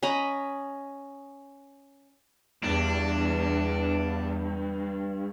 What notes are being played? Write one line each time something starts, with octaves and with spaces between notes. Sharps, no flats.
C#4 D#5 A#5 B5
E2 G2 D4